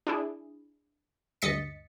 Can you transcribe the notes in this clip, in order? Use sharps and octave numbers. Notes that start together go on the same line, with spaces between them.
D4 E4 G#4
D2 G2 D#5 A6 B6 C#7